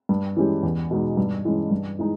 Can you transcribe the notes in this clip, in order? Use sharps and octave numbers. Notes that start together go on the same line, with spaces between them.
G2
E3 G#3 C#4 G4
E2
B2 G#3 D#4
G2
E3 G#3 C#4
G2
E3 G#3 D#4